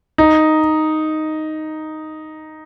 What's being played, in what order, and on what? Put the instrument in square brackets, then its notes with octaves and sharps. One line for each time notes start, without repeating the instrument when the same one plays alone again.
[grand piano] D#4